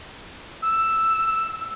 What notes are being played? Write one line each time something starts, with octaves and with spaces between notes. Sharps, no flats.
E6